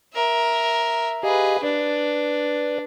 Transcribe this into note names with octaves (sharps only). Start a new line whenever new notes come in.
A#4 E5
G4 G#4 B4 D#5 F5
D4 B4 D5